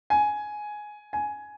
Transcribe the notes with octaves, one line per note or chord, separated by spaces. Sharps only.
G#5
G#5